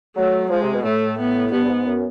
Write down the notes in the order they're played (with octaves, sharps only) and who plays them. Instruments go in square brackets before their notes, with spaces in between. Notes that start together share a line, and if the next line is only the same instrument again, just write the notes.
[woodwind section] F#3 [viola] A3
[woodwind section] F3 [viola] G#3
[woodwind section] C3
B2
[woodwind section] A2 [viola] A3
[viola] B3
[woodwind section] G2 [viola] B3
[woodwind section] G2
G#2
F#2